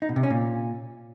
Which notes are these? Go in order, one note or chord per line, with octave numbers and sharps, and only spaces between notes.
D#4
B2
C3
C#4
A#2